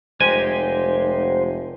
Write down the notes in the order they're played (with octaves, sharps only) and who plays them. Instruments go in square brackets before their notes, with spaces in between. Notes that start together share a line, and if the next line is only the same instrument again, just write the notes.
[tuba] F1 [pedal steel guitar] G#3 D#4 G4 [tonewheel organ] C5 [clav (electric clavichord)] G#5